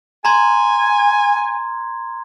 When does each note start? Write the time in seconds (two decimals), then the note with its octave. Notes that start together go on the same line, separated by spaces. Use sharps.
0.25 G#5 A#5 C6 G#6